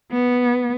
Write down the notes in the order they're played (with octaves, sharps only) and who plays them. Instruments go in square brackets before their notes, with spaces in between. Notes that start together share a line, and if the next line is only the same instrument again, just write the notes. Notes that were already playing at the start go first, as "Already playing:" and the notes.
[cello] B3